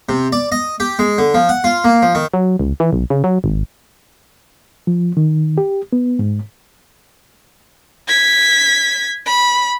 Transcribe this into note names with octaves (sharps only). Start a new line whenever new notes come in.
C3
D5
D#5
G4
G#3
D3
F3
F#5
F4
A#3
F3
D#3
F#3
C#2
E3
B1
C#3
F#3
G#1
F3
D#3
G4
B3
G#2
G#6 B6
B5